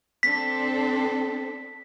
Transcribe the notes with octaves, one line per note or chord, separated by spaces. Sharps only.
C4 D4 A4 B6